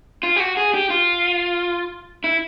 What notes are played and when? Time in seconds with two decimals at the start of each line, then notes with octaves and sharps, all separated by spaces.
0.23 F4
0.36 G4
0.40 F#4
0.57 G#4
0.74 G4
0.90 F4
2.24 E4